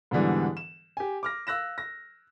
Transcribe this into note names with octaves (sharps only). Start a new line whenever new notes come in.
G#2 B2 D3 E3 G3
E7
G4 G#5
D6 F6 A#6
F5 E6 F#6 A#6 E7
A#6